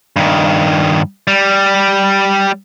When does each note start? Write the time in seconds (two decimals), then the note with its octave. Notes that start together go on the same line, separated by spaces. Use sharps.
0.16 G2 D#3
1.27 G3